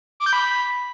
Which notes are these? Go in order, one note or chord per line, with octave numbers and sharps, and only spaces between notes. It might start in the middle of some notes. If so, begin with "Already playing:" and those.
D6
G6
B5